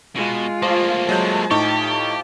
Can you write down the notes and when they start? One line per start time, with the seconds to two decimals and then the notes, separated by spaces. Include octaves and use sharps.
0.16 B2 G#3 F4
0.62 F3 A3 A#3
1.09 F#3 G#3 A5 G6
1.51 A2 D#4 G4 C#6